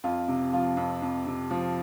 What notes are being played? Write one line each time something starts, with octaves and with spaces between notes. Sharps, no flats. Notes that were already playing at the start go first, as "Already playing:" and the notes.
F2 F4
C3
F3 F4
F2
F2
C3
F3